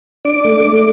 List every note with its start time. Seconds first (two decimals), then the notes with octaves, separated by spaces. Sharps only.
0.25 D4 D6
0.45 A3
0.65 A3